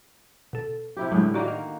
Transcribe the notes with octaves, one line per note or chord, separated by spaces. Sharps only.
B2 A4
C3 E4 G4
A2 D3 F#3 G#3
D#3 A#3 F#4 G4 D5 D#5
F5